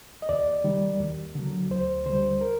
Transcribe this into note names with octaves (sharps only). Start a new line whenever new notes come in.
D#5
D#2 D5
D#3 G3
D#2
D3 F#3
D2 C5
D3 G3 C5
A#4